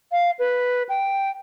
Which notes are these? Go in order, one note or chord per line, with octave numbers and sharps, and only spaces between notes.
F5
B4
G5